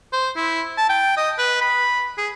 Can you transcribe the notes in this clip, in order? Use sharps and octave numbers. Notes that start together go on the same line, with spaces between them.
C5
E4
A5
G5
D#5
B4
B5
G#4